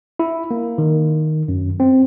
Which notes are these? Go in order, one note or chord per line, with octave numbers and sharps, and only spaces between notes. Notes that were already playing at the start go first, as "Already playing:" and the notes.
E4
A#3
D#3
F#2
C4